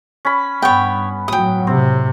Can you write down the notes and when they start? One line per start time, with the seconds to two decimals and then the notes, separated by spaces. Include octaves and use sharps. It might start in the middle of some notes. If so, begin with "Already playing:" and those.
0.25 C#4 B5
0.62 G2 B3 C#5 G5
1.28 A2 F#3 G5 D#6
1.67 A2 C3 C4